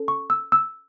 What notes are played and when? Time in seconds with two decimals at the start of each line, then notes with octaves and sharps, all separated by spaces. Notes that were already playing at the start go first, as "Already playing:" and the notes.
Already playing: C#4 A4
0.08 C#6
0.30 E6
0.52 E6